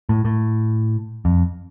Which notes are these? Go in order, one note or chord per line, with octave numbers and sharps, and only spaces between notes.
A2
A2
F2